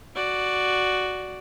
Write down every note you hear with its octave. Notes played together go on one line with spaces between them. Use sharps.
F#4 D5